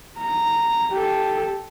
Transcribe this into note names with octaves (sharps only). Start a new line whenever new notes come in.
A#5
G4 A4